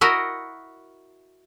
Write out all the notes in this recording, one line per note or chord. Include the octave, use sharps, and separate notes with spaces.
E4 F#4 A#4 D#5